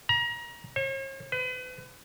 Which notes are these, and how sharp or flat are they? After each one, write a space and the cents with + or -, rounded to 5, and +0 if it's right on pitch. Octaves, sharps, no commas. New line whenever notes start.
A#5 +30
C#5 -45
B4 +35